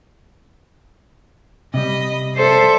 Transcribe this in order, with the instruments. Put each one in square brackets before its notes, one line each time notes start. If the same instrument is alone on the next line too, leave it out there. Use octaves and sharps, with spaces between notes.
[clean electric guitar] C3 G3 [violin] D#5 B5
[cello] A4 C5 [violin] D5 E5